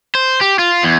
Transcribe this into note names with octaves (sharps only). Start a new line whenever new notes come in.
C5
G4
F4
E2